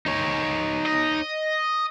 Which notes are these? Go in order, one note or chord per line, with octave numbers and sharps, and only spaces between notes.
D#4 C#5
D#5